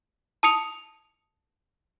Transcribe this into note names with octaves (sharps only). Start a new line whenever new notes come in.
A5 D#6 C#7 F7